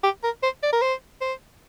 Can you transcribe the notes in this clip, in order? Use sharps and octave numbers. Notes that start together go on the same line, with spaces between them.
G4
A#4
C5
D5
A#4
C5
C5